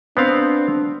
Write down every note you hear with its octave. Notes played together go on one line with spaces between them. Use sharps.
B3 C4 D4 F5